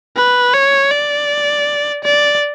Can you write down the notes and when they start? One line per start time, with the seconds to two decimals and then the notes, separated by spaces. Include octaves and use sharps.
0.17 B4
0.54 C#5
0.91 D5
2.04 D5